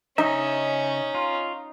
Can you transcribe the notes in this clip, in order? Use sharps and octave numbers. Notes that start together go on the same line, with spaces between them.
C#3 C#4 D#4 D#5 E5
F4